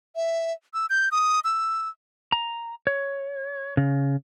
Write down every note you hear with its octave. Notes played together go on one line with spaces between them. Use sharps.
E5
E6
G6
D#6
E6
A#5
C#5
C#3